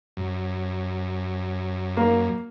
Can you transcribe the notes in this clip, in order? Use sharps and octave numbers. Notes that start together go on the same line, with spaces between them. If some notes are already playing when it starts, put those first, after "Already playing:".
F#2
A#3